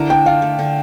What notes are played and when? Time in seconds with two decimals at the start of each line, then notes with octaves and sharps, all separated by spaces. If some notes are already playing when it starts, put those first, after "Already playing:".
Already playing: D3 A3 E4 A#4
0.10 D4 G5
0.26 F4 F5
0.42 A3
0.59 D3